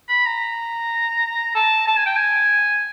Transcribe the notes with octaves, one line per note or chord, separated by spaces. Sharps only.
B5
A#5
A5
A5
G#5
G5
G#5